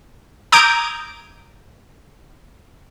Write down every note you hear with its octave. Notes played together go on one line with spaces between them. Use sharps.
A#5 D6 D#6 G6 G#6 D7